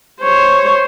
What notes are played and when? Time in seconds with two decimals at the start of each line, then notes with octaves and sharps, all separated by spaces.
0.23 C5 C#5